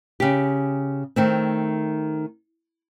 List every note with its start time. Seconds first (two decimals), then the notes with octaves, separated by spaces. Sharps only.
0.20 C#3 G4
1.16 D#3 A3 C4